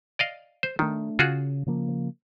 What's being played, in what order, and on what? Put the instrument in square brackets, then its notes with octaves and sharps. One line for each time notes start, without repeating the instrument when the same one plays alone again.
[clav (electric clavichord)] D5 D#5 F5
C5
[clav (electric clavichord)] D#3 [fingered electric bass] A3 D4
[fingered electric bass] C#3 [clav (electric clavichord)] F4 F#4 G#4
[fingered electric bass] C#3 F3 A#3